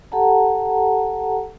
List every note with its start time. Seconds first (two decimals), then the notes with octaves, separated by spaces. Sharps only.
0.12 G4 A4 F#5 A5 A#5